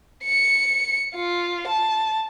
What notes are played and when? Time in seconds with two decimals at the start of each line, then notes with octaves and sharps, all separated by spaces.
0.24 C#7
1.15 F4
1.68 A5